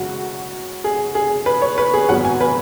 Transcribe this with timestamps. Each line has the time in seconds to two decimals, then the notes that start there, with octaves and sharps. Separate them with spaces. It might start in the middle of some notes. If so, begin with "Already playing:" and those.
Already playing: F#2 C#3 G#3 C#4 F#4
0.84 G#4
1.15 G#4
1.46 B4
1.62 C#5
1.78 B4
1.94 G#4
2.09 G#1 F#2 F#3 B3 F#5
2.25 G#5
2.41 B4